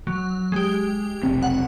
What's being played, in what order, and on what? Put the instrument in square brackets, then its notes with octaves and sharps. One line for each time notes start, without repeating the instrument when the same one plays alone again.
[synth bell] F#3
G#3 G4
[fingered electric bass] F1 B1 C4
[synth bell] F#5